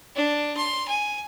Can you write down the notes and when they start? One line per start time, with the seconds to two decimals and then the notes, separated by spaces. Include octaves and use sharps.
0.16 D4
0.57 C6
0.88 G#5